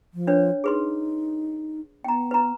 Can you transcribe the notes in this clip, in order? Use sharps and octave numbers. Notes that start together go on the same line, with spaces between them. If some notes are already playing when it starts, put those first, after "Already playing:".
F3
D4 B4 C#5
D#4 G#4 B4 C6
B3 G5 A#5
B4 A#5